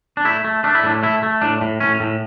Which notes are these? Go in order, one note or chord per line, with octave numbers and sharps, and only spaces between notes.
D4
A3 E4
A3
A3 D4
E4
A2 D4
A3 E4
A3
A2 D4
A2
A2 C#4
A2